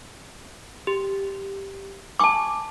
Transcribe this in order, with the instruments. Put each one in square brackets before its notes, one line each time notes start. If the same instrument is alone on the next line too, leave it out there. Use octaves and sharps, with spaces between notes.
[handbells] G4
[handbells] G#5 C#6 [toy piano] A5 D6